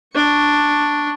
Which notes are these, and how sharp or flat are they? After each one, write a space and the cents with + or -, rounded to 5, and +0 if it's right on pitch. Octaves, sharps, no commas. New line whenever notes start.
D4 +0 C#6 +0